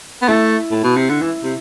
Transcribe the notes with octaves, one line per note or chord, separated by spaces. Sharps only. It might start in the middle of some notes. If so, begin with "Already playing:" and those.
B3
A3 E4
A2
B2
C3
D3
E3 E4
C3